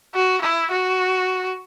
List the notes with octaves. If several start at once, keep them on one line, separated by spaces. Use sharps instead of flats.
F#4
E4
F#4